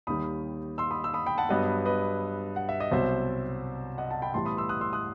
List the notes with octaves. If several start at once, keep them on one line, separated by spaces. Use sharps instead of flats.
D#2 D#3 G3 B5 D#6
C6 E6
B5 D#6
E6
B5 D#6
G5 B5
F#5 A5
G2 F#3 B3 B4 D#5
B4 D#5
F#5
E5
D#5
C2 B2 F#3 C4 C5 E5
D#5 F#5
F#5 A5
G5 B5
A2 E3 G3 B3 A5 C6
B5 D#6
C6 E6
D#6 F#6
C6 E6
D#6 F#6